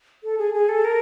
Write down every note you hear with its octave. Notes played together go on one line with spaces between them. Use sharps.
A4
G#4
G#4
A4
A#4